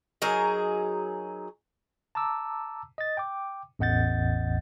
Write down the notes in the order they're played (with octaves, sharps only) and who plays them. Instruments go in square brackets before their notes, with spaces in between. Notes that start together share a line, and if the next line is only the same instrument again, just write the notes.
[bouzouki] F#3 D#4 G#4 A#4
[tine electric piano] A5 A#5 D6 E6
D#5 A6
G5 D6
A1 E2 D#5 F#5 G6 A6